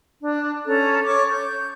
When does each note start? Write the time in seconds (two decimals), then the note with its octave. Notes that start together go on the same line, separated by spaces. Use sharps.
0.21 D4
0.66 C#4 A4 A#5
1.04 C#5 C#6 D6
1.30 G6